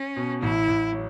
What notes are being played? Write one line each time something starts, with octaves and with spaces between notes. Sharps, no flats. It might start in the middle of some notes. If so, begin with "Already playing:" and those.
Already playing: C#4
B2
A1 E4
A1
F#3